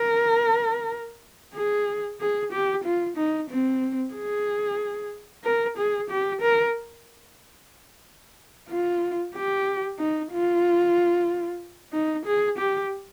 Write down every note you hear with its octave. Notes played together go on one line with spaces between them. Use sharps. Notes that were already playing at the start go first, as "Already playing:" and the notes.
Already playing: A#4
G#4
G#4
G4
F4
D#4
C4
G#4
A#4
G#4
G4
A#4
F4
G4
D#4
F4
D#4
G#4
G4